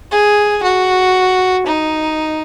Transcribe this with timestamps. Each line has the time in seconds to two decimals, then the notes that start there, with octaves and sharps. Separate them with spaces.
0.12 G#4
0.63 F#4
1.67 D#4